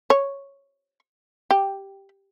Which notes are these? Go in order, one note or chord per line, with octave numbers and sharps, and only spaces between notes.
C#5
G4